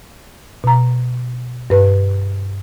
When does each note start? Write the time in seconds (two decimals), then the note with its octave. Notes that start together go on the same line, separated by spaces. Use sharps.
0.64 B2 A#5
1.70 G2 B4